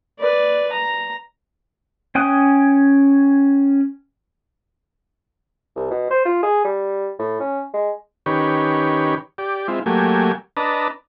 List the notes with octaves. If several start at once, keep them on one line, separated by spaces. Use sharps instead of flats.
B4 D5
A#5
C#4 G5 G#5 D#6 F#6
C2
B2
C5
F4
G#4
G3
A2
C#4
G#3
D#3 C#4 G4 B4 C#5
G4 D5
G#3 C4 E4 F4
F#3 A3 A#3 G4 G#5
D4 B4 D#5 A5 A#5